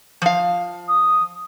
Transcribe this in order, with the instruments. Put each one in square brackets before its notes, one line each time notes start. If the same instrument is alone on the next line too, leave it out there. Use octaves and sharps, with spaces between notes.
[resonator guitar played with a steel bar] F3 F5
[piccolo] D#6